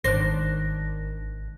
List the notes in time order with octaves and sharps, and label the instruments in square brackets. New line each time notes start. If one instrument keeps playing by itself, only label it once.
[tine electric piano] G#1 F#6 [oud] D#3 D4 C5 [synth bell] A#6